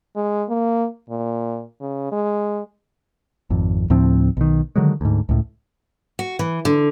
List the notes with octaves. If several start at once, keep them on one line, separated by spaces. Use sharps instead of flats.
G#3
A#3
A#2
C#3
G#3
G#1 F2
D2 A2 F3 C4
B1 D#3
D3 D#3 F#3 G#3
D2 G#2
C#2 A2
F#4
E3
D3